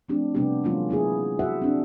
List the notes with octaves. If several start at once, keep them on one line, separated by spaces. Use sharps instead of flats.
F3 A3 C4 D4 G4
C3 G3 B3 D4 G4
E3 F#3 G#3 A#3 C#4 F4
F#3 B3 E4 G#4
E4 F#4 C5 E5 F#5
C4 D4